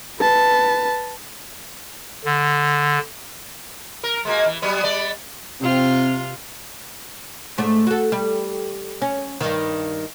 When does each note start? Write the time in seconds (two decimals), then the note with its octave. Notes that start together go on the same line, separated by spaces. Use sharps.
0.20 B4 A5
2.25 D3
4.03 A#4
4.25 G#3 A#3 F#4
4.46 E3
4.62 F#3 G3 B3
4.84 G3 B3 D5
5.60 C3 C4 F4
7.58 G#2 A3 D4
7.87 F#4 A4
8.12 G3
9.02 C#4
9.41 G2 D#3